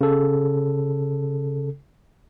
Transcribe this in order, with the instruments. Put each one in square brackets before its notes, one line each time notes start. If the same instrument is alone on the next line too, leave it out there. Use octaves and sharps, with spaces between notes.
[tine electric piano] C#3 A4